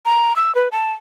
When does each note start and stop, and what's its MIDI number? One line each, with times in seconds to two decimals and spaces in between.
0.05 0.35 82
0.36 0.54 88
0.55 0.68 71
0.72 0.93 81